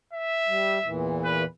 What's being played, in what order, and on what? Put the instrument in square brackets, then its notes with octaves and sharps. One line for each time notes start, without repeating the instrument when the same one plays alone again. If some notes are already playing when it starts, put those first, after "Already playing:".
[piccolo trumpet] E5
[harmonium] G3
E2 A#2 E3
[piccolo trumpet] B4